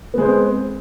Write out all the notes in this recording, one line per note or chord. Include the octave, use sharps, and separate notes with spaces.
G#3 B3 C4 C5